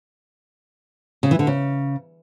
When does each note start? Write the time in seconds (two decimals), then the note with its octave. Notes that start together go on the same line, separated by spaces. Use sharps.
1.23 C#3
1.31 E3
1.39 D3
1.47 C#3